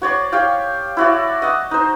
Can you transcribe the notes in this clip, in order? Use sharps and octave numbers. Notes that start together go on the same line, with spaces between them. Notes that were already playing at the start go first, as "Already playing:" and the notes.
F#4 C#5 D5 C6
G4 C#5 F5 G5
E4 F#4 D5
D#5 F#5 A5
D#4 C5